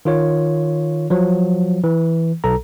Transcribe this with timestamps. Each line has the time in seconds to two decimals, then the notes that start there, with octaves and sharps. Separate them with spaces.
0.05 D#3 F4 C#5
1.10 F3 F#3
1.84 E3
2.44 B1 A4 A#5